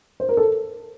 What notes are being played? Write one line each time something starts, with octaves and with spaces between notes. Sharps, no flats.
C5
A#4
A4